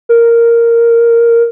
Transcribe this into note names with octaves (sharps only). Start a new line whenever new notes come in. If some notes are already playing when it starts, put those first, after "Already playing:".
A#4